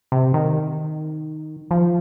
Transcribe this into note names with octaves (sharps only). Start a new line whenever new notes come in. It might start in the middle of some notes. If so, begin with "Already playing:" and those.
C3
D#3
F3